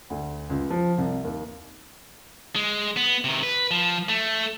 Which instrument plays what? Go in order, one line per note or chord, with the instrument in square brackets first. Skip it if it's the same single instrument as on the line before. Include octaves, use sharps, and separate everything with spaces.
[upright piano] D2
C#2
F3
C2
D#2
[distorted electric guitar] G#3
B3
C3 D#3
B4
F3
A3